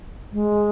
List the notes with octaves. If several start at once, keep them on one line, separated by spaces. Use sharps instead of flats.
G#3